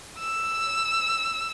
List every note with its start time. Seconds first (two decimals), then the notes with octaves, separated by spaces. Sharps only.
0.19 E6